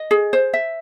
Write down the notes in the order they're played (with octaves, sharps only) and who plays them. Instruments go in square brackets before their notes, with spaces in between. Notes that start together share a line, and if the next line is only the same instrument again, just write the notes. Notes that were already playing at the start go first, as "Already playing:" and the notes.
Already playing: [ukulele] D#5
G#4
C5
E5